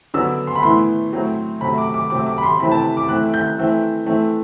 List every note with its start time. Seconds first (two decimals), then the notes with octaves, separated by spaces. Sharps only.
0.14 D3 F#3 B3 E6
0.47 C6
0.56 B5
0.63 A2 E3 B3 C6
1.13 A2 F#3 C4
1.61 C3 F#3 A3 B5
1.78 D6
1.94 D6
2.10 C3 F#3 A3 C4 D6
2.26 D6
2.38 B5
2.43 C6
2.60 C3 E3 A3 C4 B5
2.72 A5
2.97 D6
3.09 E3 A3 C4 F#6
3.34 G6
3.58 E3 A3 C4
4.06 E3 A3 C4